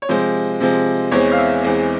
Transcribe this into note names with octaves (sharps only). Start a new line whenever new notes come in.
C#5
C3 F3 G#3 C5
C3 F3 G#3
E2 E3 G#3 C4 C#5
F5
E5
E2 E3 G#3 C4